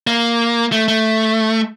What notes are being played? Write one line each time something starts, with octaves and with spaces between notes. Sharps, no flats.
A#3
A3
A3